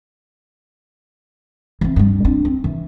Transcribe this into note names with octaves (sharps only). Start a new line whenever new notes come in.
E3 C4
G2 G3
C4 D4
C4
E3